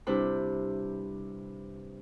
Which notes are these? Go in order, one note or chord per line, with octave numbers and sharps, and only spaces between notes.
C3 G3 D4 E4 B4 C5